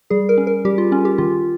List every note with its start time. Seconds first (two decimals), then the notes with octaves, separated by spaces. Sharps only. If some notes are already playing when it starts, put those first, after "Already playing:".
0.10 G3 G#4
0.29 A#4
0.38 C#4
0.47 A#4
0.65 G3 G4
0.78 F4
0.92 C#4 F4
1.05 G4
1.18 D#3 F4